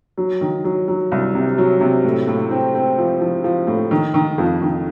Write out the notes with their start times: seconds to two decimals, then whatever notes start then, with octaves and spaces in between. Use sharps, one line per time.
0.17 F#3
0.41 D#3
0.64 F#3
0.88 F#3
1.12 C2
1.34 C3
1.58 F#3
1.81 C3
2.04 A2
2.27 A2
2.51 C4
2.75 C4
2.98 F3
3.21 F3
3.44 F3
3.67 A2
3.91 D#3
4.14 D#3
4.38 F2
4.62 D#3